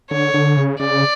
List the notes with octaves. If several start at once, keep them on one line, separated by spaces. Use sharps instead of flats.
D3 C#5
D3
C#3
C#3 D5